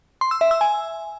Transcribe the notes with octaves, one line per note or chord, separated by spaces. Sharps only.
C6
E6
E5
E6
G#5